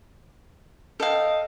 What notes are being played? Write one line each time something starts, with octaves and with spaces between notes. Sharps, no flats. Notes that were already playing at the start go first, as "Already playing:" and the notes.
A4 D#5 F5 G5